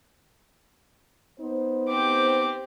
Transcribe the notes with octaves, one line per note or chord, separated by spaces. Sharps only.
B3 D#4 C5
C4 G4 D6